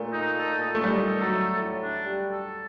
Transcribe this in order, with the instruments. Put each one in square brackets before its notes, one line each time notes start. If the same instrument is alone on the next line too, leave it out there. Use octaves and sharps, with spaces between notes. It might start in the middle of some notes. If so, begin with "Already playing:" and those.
Already playing: [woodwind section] A#2 [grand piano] A3
[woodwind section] D#4
A4
A#2
[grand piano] A3
[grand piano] G3 [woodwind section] D#4
[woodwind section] A4
[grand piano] F#3
[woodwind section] A3
A2
D4
G3
A4